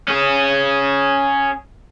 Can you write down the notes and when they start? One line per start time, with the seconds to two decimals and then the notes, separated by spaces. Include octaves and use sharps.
0.08 C#4 G#4